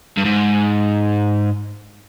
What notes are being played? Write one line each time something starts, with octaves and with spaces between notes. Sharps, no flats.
G2
G#2